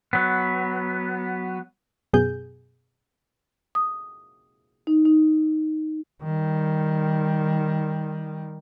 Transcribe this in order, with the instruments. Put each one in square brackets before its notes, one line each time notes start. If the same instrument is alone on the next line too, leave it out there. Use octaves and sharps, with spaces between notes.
[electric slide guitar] F#3 B3
[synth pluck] F#2 B2 G#4 G6
[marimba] D#6
D#4
D#4
[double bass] D#3 G3